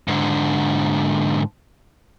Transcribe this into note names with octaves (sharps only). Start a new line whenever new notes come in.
G#2 D3